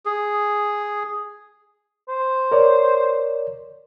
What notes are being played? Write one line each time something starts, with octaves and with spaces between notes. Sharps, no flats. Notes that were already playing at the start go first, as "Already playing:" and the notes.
G#4
C5
A#4 C#5 D5